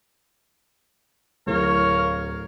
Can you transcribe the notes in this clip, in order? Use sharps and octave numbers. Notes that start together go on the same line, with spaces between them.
D1 A#4 C#5 F5